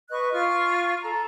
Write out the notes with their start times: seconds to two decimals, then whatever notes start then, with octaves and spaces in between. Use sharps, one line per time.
0.10 B4 D#5 C#6 F#6
0.33 F4 F5 C#6 F6
1.03 A4 A#5